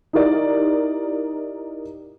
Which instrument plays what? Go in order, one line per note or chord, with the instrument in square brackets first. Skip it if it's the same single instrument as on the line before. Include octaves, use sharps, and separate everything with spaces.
[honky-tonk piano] D#4 E4 G4 A#4 D5